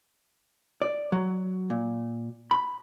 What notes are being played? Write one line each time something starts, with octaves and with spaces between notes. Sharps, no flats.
D5
F#3
A#2
B5